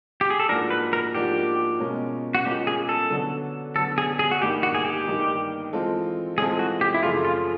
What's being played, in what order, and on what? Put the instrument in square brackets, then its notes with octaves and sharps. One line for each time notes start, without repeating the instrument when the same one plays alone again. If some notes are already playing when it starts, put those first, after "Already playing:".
[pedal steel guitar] G4
G#4
A4
[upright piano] G#2 F3 A#3 D4 F#4 [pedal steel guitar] A#4
[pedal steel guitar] B4
A#4
[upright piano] G#2 F3 A#3 D4 F#4 [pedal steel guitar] G4
[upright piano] B2 G#3 C#4 F4 A#4
[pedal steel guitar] F#4
[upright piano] B2 G#3 C#4 F4 A#4 [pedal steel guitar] G4
[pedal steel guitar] G#4
A4
[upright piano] D3 F#3 B3 D4
[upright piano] D3 F#3 B3 D4 [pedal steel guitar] A4
[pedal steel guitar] G#4
G#4
F#4
[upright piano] G2 D#3 G3 A#3 D#4 [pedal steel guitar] G4
[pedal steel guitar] F#4
G#4
G4
[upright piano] G2 D#3 G3 A#3 D#4
E3 G#3 C4 F4 A4
[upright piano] E3 G#3 C4 F4 A4 [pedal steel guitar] G#4
[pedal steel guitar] F#4
G4
E4
[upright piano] F#2 C#3 F3 A3 [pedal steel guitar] F4
[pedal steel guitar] F4